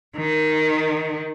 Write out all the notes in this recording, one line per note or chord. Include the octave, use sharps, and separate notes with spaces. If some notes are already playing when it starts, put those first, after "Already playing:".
D#3